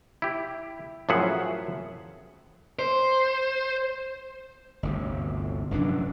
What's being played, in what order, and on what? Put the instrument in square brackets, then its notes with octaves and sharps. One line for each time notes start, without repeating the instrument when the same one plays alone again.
[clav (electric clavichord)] E4 G4
F#2 A2 F3 G#4 E5 F#5
[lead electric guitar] C5
[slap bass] G1 D2 C3
F1 F#2 E3 D4